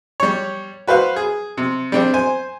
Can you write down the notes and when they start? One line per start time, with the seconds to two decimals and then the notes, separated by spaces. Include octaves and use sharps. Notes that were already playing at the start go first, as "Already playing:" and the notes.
0.20 G3 C#5
0.88 F#4 B4 C5 F5
1.16 G#4
1.57 C3
1.92 G3 C4 D4
2.14 C5 G#5